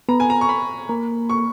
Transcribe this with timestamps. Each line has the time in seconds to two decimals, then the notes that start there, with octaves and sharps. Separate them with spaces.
0.09 B3 A#5
0.20 G#5
0.30 A#5
0.41 C#6
0.49 B5
0.89 A#3
1.30 C#6